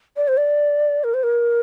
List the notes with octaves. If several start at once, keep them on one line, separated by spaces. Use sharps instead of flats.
D5
C5
D5
A#4
C5
A#4